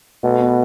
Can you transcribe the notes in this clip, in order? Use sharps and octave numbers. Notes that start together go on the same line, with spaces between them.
B2 A3
B3